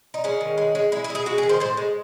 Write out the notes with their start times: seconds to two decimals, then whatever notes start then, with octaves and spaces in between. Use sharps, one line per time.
0.14 D#4
0.24 G#3 C#4
0.41 D#3
0.58 G#3
0.75 G#3
0.92 G#3 E4
1.04 E4
1.10 G#3
1.15 G#4
1.26 G#3 F#4
1.38 G#4
1.43 D#3
1.49 C5
1.60 A2 C5
1.77 G#3